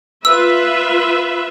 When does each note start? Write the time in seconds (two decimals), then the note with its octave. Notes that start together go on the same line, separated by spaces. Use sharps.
0.25 F4 B4 E5 E6